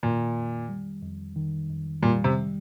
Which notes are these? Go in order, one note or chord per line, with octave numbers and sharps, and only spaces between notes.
A#2 D#3
F2
G3
F2
D#3
F2
A#2 G3
C3